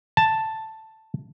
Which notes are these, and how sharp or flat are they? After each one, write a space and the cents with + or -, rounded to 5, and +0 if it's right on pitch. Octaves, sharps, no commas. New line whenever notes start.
A5 +5